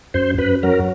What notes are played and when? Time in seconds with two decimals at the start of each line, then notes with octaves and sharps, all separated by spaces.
0.14 F#2 C5
0.38 F#2 B4
0.63 F#3 A#4